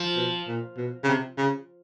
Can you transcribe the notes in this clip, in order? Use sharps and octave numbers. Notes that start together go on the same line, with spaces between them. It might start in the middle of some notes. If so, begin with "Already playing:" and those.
Already playing: F3
B2
A#2
B2
C#3
C3
C#3